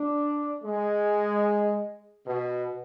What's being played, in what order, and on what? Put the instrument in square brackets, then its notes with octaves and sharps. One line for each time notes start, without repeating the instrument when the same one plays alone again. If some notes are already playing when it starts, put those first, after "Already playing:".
Already playing: [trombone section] D4
G#3
B2